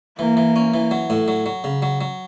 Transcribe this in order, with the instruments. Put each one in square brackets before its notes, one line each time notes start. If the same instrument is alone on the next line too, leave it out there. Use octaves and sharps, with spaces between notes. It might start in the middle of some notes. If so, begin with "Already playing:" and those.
[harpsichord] E3 [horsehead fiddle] A#3
[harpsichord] E3
C#4
E3
F#3
A2
F#3
F#3
C#3
F#3
F#3